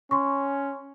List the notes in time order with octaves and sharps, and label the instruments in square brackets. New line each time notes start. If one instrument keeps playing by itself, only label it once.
[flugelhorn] C#4 [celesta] C6 C#6